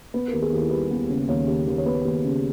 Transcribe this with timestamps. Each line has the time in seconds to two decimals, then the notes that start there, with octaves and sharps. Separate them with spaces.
0.14 B3 B4
0.28 D#2 A#4
0.42 G#4
0.52 D#2 E4
0.71 G3 B4
0.91 B3
1.10 C#3
1.28 D#2 C#5
1.48 D#2
1.67 D#2
1.78 C#5
1.86 B3 B4
2.05 D#2
2.25 C#3